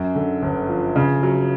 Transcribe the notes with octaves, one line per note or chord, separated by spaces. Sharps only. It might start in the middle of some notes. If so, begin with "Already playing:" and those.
Already playing: F#2
D3
G1
F3
C#3
F#3